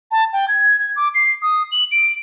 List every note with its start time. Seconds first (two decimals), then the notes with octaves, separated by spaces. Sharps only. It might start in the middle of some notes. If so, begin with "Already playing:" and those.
0.11 A5
0.33 G5
0.48 G#6
0.80 G#6
0.96 D6
1.15 C7
1.42 D#6
1.72 F#7
1.92 D7